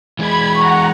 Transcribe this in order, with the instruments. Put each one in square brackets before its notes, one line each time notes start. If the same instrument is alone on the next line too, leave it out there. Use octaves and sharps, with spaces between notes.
[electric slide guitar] E3 G#3 G#4 [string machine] B5 G#6
[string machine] F#5 A#5 [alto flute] C#6